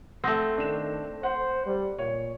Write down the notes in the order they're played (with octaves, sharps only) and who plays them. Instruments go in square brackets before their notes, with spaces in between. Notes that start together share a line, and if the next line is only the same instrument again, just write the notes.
[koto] A3 C4 [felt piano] F#5 D#6 A#6
[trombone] D#3 [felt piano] D4 E7
[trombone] C5 [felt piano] F#5
[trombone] G3
[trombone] A#2 [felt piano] C#5